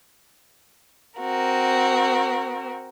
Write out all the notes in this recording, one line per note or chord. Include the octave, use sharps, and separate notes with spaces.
C4 F#4 A#4